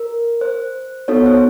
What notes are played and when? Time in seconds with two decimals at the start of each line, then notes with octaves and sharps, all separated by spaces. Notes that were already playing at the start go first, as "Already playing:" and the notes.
Already playing: A#4
0.41 C5
1.08 B3 D#4 F#4 A4 C#5
1.26 C5